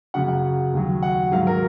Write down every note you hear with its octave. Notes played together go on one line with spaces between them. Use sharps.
F#2 C#3 F#3 F#5
F#5
D#2 D#3 F#3
F#5
G#2 D#3 F#3 F5
A#4